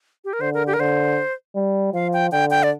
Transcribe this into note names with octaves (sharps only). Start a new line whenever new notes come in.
G4
A#4
D3 C5
A#4
G4
A#4
D3 C5
G3
F3 F5
G5
D3 G5
G5
D5